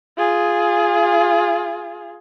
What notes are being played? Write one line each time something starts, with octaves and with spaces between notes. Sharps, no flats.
F4 G#4